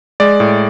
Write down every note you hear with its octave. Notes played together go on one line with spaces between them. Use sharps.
G#3 D5
A2